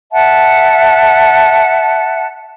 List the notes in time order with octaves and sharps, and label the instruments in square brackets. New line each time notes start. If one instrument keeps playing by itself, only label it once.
[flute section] E5 F#5 A5